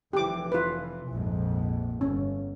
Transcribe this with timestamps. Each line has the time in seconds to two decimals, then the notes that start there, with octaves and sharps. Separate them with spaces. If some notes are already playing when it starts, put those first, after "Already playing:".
0.13 F1 E3 G4 D6
0.52 F4 B4
1.08 A#1 F2 G#2
2.01 G1 C#4